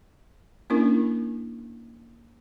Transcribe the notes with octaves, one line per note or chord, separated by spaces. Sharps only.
A#3 C#4 D4 E4 A#4